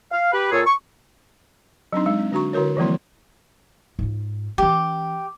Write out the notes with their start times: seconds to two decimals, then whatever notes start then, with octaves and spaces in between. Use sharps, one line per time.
0.11 F5
0.32 G4 B4
0.52 A#2 G#4 A4 C#5
0.66 C#6
1.93 F#3 C4 D4 D#4
2.06 G#3 D#4
2.19 C4
2.32 D3 D4 F#4 A#5 C#6
2.53 D3 E4 F#4 A#4 C#5
2.77 E3 F3 G3 A#3 C4 E4
3.99 G#2 F4
4.58 E3 C#4 G4